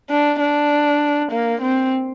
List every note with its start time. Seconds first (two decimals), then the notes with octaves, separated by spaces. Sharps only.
0.10 D4
0.40 D4
1.32 A#3
1.62 C4